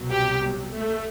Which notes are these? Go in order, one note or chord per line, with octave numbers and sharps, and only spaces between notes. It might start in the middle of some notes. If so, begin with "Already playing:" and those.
Already playing: C2 B2 F#3
G4
A3